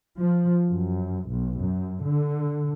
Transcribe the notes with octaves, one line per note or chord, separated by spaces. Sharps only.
F3
F#2
B1
F#2
D3